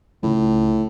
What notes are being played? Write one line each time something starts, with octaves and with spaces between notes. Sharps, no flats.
C#2 A2